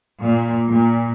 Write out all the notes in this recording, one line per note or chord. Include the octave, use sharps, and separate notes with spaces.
A#2
A#2